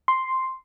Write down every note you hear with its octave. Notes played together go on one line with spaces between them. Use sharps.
C6